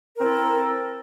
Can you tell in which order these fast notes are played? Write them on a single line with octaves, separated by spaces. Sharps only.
A#4 C4 E4 A4